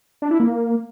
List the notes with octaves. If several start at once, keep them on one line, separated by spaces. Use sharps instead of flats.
D4
E4
A#3